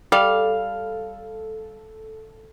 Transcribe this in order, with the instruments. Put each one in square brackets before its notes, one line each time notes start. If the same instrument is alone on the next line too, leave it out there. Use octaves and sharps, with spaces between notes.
[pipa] G3 [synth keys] A4 [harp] F5